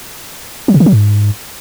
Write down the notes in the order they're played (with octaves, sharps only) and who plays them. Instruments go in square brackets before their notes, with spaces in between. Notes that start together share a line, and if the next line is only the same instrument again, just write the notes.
[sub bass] F#3
C3
D#3
F#3
G#2